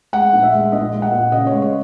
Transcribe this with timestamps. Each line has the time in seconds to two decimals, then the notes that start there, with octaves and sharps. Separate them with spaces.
0.13 G#3 F#5
0.33 A#1
0.43 E5
0.53 G#3
0.72 A#1 D#5
0.93 G#3
1.02 F#5
1.12 A#2
1.32 C#3 D#5
1.47 C#5
1.52 G#3
1.62 C#5